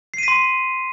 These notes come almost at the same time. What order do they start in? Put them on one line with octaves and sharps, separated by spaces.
C7 D#7 B6 C6